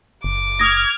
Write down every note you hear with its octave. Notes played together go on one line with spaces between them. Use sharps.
F#1 D6
D#6 F6 G#6 A#6